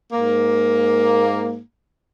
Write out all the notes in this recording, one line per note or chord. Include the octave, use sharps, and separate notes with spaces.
G#2 A#3